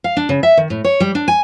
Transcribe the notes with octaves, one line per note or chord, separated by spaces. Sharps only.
F5
D4
C#3
E5
D#3
A2
C#5
G3
D4
G#5